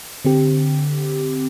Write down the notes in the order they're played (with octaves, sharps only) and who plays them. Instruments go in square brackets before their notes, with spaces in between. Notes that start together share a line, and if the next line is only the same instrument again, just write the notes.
[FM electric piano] D3 C4 G4